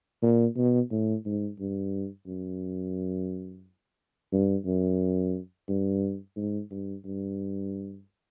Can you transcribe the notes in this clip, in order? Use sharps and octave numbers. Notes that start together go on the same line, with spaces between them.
A#2
B2
A2
G#2
G2
F#2
G2
F#2
G2
G#2
G2
G2